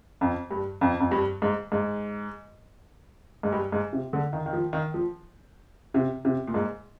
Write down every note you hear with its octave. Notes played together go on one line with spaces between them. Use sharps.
F2
G2
F2
F2
G2
G#2
G#2
G#2
G2
G#2
C3
D3
D#3
D#3
F3
D#3
F3
C3
C3
A#2
G#2